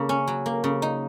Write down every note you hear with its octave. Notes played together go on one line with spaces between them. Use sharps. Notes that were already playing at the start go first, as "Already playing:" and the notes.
Already playing: C#3 A#3
C#4
F#3
A#3
C#3
D#4